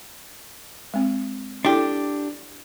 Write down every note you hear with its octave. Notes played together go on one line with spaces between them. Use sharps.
G#3 C4
D4 E4 G4 A4